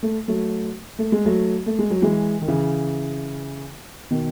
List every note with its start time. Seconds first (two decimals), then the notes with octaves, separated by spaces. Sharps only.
0.03 A3
0.28 F#3 A3
0.99 A3
1.12 G#3
1.25 F#3 A3
1.66 A3
1.79 G#3
1.90 F#3
2.02 E3 G#3
2.41 D#3
2.48 C#3 E3
4.11 B2 D#3